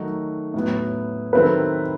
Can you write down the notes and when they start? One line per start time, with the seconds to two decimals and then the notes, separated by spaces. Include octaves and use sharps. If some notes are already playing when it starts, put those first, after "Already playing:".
Already playing: D#3 F#3 A3 D#4 F#4
0.54 A2 F#3 B3 E4
1.33 D#3 F#3 C4 E4 A4 B4